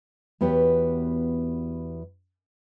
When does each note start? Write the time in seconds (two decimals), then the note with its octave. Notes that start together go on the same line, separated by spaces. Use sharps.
0.41 E2 B3 F#4 G4 C#5